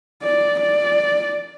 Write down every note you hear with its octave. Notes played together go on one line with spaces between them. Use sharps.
D5
D5